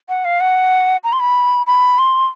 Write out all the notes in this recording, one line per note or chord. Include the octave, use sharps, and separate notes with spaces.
F#5
F5
F#5
A#5
C6
B5
B5
C6